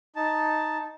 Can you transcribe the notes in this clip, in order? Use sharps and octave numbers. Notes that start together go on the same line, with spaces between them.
D#4 A5